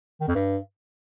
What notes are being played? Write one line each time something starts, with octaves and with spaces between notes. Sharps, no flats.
D#3
F2
G2